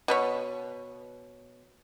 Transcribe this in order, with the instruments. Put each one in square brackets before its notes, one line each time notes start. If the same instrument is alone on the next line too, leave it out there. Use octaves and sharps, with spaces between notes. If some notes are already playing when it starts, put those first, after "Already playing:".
[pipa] B2 B4 C#5